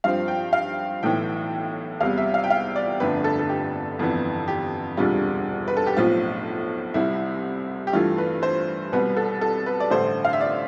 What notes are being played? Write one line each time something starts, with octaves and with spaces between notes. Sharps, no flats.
G2 F3 C4 F5
G5
F5
B1 A2 E3 G5
E2 C3 G3 F5
E5
F5
G5
F5
D5
G1 F2 D3 A3 D4 B4
A4
A4
G4
G1 F2 E3 B3
G4
E1 D2 C3 G3 F4
B4
A4
G4
B1 A2 F3 C4 F4
C2 C3 G3 E4
G4
G2 E3 A3 F4
B4
C5
C2 B2 G3 B3 B4
A4
A4
B4
D5
A1 G2 D3 A3 C5
F5
E5
D5